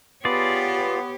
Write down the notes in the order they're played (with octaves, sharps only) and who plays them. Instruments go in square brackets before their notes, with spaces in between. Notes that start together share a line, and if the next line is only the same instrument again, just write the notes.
[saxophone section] B3 [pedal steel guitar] F4 G#4 D5 [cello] G4 C#5